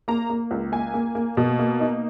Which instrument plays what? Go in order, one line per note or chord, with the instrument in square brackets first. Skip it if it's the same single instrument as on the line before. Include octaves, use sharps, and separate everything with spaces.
[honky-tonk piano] A#3 A#5
A#3
C#2
A#3 G#5
A#3
A#3
B2
A#3
D#4